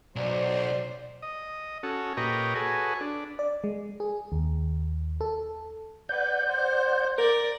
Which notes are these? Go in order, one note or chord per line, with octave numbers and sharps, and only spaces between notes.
B1 F#3 C5 D5
D#5
C#4 F#4 A4
A#2 G4 B4 C#5 D#5 A#5
F#4 G#4 A4 B4 C#5
D4
D5
G#3
G#4
D#2
A4
B4 D5 F#5 G6
C5
A#4 D5